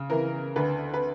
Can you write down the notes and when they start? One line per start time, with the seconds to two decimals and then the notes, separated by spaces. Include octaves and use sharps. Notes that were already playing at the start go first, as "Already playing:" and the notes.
Already playing: C#3
0.10 E3 A#4
0.56 D2 B4
0.94 B4